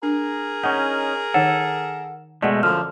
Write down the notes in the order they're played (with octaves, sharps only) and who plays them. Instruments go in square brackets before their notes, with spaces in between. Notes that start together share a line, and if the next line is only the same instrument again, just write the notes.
[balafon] D4 [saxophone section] G#4 A#4
[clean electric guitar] C#4 D#4 [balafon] F#5
[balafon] D#3 D#4 C#5 [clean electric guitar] A4 [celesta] F#5
[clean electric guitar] B2 G#3 A3 [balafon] D5 F#5
[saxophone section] F#2 D3 [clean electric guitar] F3 [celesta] F6